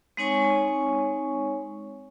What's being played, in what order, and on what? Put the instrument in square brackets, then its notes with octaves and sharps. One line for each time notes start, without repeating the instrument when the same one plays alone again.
[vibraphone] G#3 C4 D#4 C#5 G#5 C#6